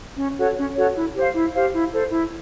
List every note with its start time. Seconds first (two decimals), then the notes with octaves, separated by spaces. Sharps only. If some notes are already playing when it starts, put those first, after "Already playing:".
0.18 C#4
0.37 F#4 A4 C#5
0.56 C#4
0.76 F#4 A4 C#5
0.96 E4
1.15 G4 C5 F5
1.35 E4
1.55 G4 C5 F5
1.74 E4
1.93 A4 C5
2.12 E4